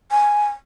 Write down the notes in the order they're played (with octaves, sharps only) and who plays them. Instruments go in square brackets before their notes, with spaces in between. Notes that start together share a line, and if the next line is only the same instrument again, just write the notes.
[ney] G#5